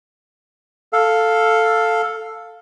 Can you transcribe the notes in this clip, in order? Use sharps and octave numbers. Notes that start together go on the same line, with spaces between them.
A4 F5